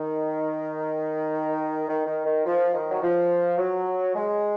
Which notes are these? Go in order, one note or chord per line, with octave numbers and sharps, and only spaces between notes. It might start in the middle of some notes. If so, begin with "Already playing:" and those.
Already playing: D#3
D#3
D#3
D#3
F3
D#3
F#3
F3
F#3
G#3